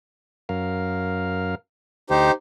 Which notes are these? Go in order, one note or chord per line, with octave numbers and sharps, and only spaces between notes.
F#2 A#4 F5
D2 D#4 G4 C5